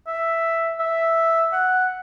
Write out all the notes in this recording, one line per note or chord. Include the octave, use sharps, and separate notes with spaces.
E5
E5
F#5